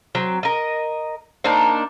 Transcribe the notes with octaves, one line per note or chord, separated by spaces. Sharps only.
F#3 C4
A#4 D#5
A#3 D4 D#4 C5